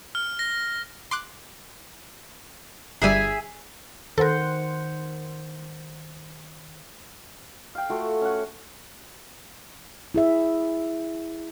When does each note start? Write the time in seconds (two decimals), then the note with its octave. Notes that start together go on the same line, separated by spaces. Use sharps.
0.15 F6
0.39 A#6
1.11 C6 D6 F#6
3.02 G1 G3 G#4 E5 G#5
4.18 D#3 A4 A#4 C5 F#5
7.75 F5 G5
7.90 A3 F4 F#4
8.21 C#4 F#5
10.14 E4 G#4 E5